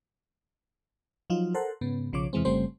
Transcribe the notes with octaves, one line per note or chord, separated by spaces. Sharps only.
F3 F#3 D#4 F4
A4 A#4 C5 F#5
G#2 C#3 B3
B1 C#3 F3 C#5 D6
E2 C3 E3 G#3 C4
G1 C#3 G3 A3 C4 C5